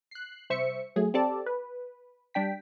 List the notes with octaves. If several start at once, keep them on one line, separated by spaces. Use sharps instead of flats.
F#6 C7
C2 C5 E5 C#6 C#7
F#3 A3 G#4
C4 G4 A4 D5 A5
B4
G3 D4 G5 B6